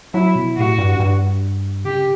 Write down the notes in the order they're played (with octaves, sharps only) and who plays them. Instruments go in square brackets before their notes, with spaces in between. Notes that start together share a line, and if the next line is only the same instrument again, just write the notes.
[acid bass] F#3 [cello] E4
[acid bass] B2
[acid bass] A2 [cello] F#4
[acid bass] G2
G2
[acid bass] C#3 [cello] G4